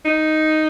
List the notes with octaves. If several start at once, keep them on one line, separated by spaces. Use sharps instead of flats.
D#4